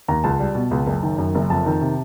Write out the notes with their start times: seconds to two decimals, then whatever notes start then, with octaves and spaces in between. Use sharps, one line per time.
0.08 D#2 A#5
0.24 C#2 A5
0.40 G3
0.55 B2
0.71 C#2
0.87 F#1
1.03 D#3
1.18 F#2
1.35 F#1
1.50 F2 A5
1.66 D#3
1.81 C3